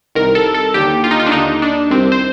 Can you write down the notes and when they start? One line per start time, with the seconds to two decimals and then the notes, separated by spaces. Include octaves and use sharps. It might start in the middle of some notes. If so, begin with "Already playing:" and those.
0.15 C2 C3 D#3 A#4
0.35 A4
0.54 A4
0.74 D#2 D3 G4
1.04 F4
1.11 D#4
1.20 F4
1.26 D4
1.32 D#2 D3 D#4
1.62 D4
1.90 C2 C3 D#3 C4
2.12 C5